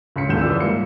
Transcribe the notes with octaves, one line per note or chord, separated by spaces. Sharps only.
C#2 C#4 B6 C#7
D1 G#1 D#2 D3 G6 E7
F#1 E3 F3 D5 E6
G#2 G3 A#3 C#7